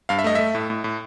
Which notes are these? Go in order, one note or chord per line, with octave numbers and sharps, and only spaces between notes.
G2 F5
E5
A3 D#5
A3 E5
A2
A2
A2